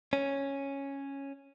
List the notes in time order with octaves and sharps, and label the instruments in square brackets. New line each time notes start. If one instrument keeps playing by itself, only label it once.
[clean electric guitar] C#4